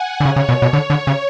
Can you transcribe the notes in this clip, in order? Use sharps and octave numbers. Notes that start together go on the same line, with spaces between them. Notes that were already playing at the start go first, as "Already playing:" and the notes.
Already playing: F#5 G#5
D3
C#3 C#5
C#3
B2
B2
D3
D3
C#3